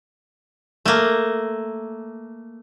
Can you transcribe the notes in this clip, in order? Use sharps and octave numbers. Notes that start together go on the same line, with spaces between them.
A3 A#3